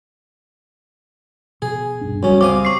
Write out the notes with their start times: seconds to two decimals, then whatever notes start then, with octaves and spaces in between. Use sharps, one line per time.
1.62 B2 G#4
2.01 D#1 G2 D4
2.23 C#2 F#2 G3 C#4
2.41 C3 F5 D6 D#6
2.65 C#6 C7